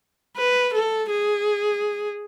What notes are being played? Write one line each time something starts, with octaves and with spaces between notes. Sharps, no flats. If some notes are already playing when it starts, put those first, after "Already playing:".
B4
A4
G#4